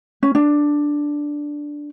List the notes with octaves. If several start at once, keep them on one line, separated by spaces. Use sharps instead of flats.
C#4
D4